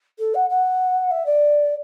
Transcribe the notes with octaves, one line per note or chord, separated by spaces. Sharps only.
A4
F#5
F#5
E5
D5